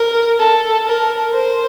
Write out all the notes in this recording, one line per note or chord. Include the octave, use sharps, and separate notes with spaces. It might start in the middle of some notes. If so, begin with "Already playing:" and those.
Already playing: A#4
A4
A#4
C5